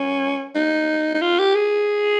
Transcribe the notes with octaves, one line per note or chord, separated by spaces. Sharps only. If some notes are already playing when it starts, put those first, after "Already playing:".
Already playing: C#4
D#4
D#4
F4
G4
G#4